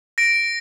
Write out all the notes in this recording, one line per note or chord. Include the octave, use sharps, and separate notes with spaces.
A#6 D7